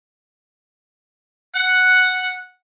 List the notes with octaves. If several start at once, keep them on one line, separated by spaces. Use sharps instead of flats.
F#5